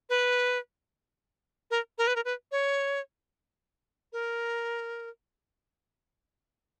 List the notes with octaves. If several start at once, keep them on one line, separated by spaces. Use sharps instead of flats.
B4
A#4
A#4
B4
A#4
B4
C#5
A#4